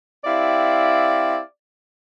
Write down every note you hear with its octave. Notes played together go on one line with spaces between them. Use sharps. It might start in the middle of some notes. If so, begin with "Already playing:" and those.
C4 E4 G4 D5 F5